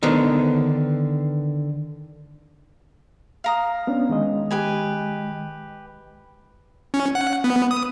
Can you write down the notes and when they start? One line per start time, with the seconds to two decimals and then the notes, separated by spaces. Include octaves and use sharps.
0.03 D3 D#3 B3 C5
3.44 F5 A#5 D#6
3.87 B3 C#4 D4
4.09 D#3 G#3 D#5
4.51 G4 B4 G#5
6.94 C#4
7.15 F#5
7.44 B3
7.71 D#6